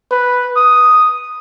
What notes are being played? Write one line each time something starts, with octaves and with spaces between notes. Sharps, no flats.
B4
D#6